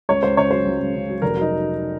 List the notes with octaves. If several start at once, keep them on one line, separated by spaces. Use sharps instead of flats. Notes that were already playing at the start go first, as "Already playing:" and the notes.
C#2 C#5
C#2 C5
C#3 C#5
F#3 C5
C#2
C#2
C#3
F#3
F1 A#4
F#3 D#4